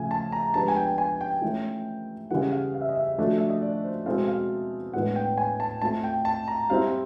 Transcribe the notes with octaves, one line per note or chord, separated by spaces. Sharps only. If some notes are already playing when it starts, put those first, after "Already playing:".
Already playing: C#3 F3 A3 G#5
A5
A#5
F3 G#3 B3 D4 G4 A5
G#5
G5
G#5
G5
E3 A3 C#4 F4
C#3 E3 G3 F#5
F5
F5
E5
D#5
E5
F3 A3 D4 F#4 A4
E5
D#5
D5
C5
B2 G#3 C4 E4 A4 F5
F5
A2 E3 G#3 B3 D4 F#5
G5
G#5
A5
A3 C4 F4 A4 A5
G5
A5
A#5
G3 C4 E4 F5